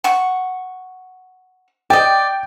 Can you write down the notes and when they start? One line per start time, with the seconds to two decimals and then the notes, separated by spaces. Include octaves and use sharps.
0.04 F#5 C#6
1.90 D5 D#5 G5